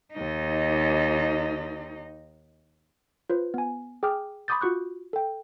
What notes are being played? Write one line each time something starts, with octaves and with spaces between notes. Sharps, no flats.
D#2 D#4
F4 B4 C5
B3 G#5
G#4 G5 D6 F6
B5 C6 D6 D#6 G6 A6
F4 F#4 C#6 F#6 G6
A4 G5